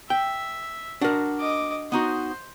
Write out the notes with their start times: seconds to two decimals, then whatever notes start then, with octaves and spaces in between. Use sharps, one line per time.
0.10 E5 G5
1.01 D4 F#4 A#4 F#5
1.40 D#5 D6
1.92 B3 D#4 F#4 C5